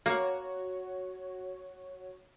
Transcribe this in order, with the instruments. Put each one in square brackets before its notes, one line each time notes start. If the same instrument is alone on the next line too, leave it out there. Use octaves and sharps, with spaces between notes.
[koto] A#3 [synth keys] F#4 C#5